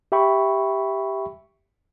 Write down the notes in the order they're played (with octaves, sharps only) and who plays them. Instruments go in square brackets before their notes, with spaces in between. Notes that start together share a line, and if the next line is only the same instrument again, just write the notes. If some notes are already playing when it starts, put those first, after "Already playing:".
[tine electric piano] G4 E5 G5 B5 C#6